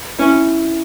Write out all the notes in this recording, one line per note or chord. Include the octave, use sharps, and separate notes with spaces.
C#4 E4